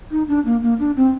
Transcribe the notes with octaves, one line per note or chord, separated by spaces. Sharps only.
D#4
D4
A#3
A#3
D4
C4